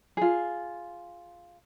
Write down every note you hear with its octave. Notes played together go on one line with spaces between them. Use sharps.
F4 G#4